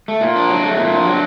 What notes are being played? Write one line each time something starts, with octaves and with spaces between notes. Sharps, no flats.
A3
A#2
D4
F#3
A3
A#2
D4
F#3